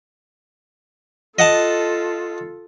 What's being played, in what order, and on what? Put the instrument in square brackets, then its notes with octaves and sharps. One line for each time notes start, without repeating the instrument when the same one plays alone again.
[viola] F4 A4 [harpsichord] D#5 F#5 A5